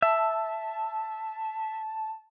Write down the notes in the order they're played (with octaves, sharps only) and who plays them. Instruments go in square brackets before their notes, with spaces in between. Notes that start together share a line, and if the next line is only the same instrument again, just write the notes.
[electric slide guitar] E5 [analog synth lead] A5